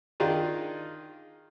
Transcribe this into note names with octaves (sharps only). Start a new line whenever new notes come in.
D#3 D4 D#4 F4 G#4